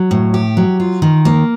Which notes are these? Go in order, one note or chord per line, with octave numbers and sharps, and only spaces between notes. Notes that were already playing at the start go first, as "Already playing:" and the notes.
Already playing: F#3
A2
G4
F#3
F4
D#3
A#3